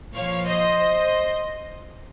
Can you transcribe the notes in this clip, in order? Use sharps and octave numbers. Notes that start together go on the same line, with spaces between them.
A#2 F3 C#5 F5
C5 D#5